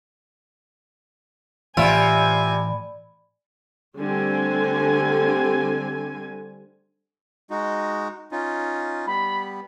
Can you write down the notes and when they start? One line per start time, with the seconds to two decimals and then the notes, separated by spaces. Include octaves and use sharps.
1.77 A2 C3 E3 F4 D5 E5 G#5 B5
3.98 D3 G3 A3 C4 G#5
7.51 G#3 D#4 F#4
8.32 C#4 D#4 F4
9.07 G3 B3 B5